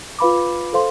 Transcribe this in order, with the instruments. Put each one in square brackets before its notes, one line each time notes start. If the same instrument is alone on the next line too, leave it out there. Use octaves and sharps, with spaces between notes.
[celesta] F4 B4 F5 B5 D6
A4 C5 F5 C6